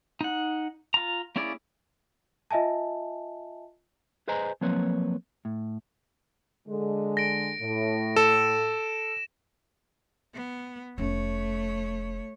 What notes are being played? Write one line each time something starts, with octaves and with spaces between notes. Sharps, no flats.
D#4 F#5
F4 A#5
A#3 C#4 E4 G#4 D5
F4 D#5 E5 G#5 A5
G#4 B4 C5 D#5 G#5 A#5
F3 F#3 A#3 C4 B4 C#5
A2
D3 G#3
A#6 D7
A2
A4 E7
B3
F1 A3 C#4 C#5